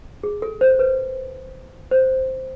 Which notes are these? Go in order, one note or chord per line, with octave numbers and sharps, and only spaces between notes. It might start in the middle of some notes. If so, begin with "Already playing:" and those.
G#4
A4
C5
B4
C5